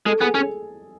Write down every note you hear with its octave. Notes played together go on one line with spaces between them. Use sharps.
G#3 A4
B3 G#4
C#4 G#4